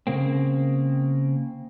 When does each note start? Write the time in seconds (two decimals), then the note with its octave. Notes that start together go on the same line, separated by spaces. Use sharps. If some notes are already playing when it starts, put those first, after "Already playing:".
0.07 C#3 A#3 C4